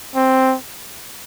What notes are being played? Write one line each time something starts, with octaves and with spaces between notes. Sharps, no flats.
C4